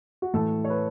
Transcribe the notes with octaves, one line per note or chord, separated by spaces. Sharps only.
F#4
A2 E3 A3 A4
C#5
B4